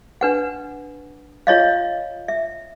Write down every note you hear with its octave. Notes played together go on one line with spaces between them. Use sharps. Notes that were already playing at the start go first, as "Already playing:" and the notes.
D4 B4 F#5
F4 C#5 D#5 F5
E5